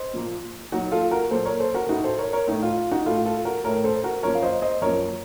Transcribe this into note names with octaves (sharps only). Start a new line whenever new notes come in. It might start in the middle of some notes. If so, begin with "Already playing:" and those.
Already playing: C5 D#5
A#2 F3 A#3
A#2 F#3 A#3 D#4 F#4
F4 A4
F#4 A#4
A#2 F#3 A#3 A4 C5
A#4 C#5
A4 C5
F#4 A#4
A2 A3 D#4 F#4
A4 C5
A#4 C#5
A#4 C#5
A2 A3 D#4
F4
F4
D#4 F#4
A2 A3 F4 A4
F4 A4
F#4 A#4
A2 A3 A#4 C#5
A4 C5
F#4 A#4
F#2 F3 A#3 A#4 C#5
F5
C5 D#5
C5 D#5
F#2 F3 A#3 A#4 C#5